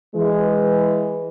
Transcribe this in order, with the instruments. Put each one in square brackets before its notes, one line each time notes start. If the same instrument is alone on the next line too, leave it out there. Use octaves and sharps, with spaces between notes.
[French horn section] E3 G#3